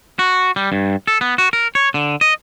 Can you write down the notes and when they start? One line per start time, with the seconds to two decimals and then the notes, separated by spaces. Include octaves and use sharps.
0.19 F#4
0.56 G3
0.72 G2
1.07 A4
1.21 B3
1.38 F#4
1.53 A#4
1.75 C#5
1.94 D3
2.21 D#5